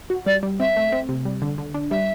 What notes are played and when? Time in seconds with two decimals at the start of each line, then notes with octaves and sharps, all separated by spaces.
0.10 F#4
0.26 G3 D5
0.43 G3
0.60 C4 E5
0.76 A3
0.92 C4
1.09 C3
1.25 G3
1.42 D3
1.58 D3
1.74 D4
1.91 G3 E5